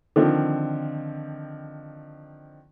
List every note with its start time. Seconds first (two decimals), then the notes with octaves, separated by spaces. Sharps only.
0.16 D3 D#3 F3 C4